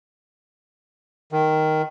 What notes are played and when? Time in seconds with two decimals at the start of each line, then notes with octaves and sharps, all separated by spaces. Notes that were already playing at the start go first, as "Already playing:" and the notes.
1.32 D#3